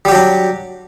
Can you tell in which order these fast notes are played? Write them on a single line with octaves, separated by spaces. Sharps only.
G3 G4 F#3 D4